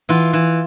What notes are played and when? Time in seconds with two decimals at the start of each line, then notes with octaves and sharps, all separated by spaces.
0.09 E3 F4
0.33 E3